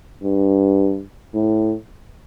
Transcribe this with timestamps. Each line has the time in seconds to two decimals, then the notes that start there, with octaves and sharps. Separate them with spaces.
0.23 G2
1.35 A2